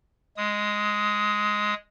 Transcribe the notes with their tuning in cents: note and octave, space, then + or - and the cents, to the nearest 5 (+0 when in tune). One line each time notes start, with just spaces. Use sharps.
G#3 +0 D#6 +20